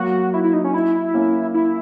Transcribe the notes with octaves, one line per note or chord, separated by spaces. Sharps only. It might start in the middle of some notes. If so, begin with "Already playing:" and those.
Already playing: F#3 A#3 F#4
E4
E4
D#4
C#4
E4
A#3 C#4
E4